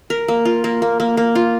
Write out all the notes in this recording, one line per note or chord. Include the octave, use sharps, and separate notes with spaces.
A#4
A#3
F4
A#3
A#3
A#3
A#3
F4